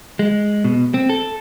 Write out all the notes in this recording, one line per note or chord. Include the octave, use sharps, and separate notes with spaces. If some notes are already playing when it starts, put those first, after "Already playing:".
G#3
B2
C4
A4